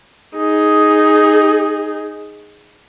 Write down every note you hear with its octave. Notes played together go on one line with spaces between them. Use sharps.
D#4 G#4